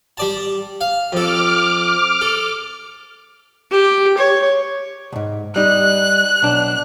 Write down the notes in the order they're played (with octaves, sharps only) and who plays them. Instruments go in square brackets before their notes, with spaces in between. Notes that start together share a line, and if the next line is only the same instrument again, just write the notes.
[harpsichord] G3 D5 A5
F5
[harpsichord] F2 A4 [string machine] D6 F6
[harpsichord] A4
[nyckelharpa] G4
C#5
[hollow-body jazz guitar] C2 G#2
[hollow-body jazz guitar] G3 D#4 [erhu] F#6
[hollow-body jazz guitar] B1 D4